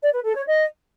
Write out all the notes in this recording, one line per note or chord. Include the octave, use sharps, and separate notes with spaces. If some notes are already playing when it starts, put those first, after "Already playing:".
D5
B4
A4
C#5
D#5